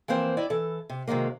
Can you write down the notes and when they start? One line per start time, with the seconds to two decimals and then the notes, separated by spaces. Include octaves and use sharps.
0.08 E3 F3 A#3 C4 C5
0.37 E4 D5 D#5
0.50 E3 A4
0.89 C3
1.07 C3 D#3 F#3 G#3 A#3